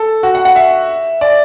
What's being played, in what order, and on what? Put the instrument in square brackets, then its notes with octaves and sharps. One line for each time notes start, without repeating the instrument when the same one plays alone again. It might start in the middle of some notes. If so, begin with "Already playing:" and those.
Already playing: [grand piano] A4
F#4
F#5
F#5
E5
D5